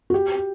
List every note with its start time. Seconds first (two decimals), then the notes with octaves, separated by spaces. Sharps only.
0.10 F#4
0.14 G4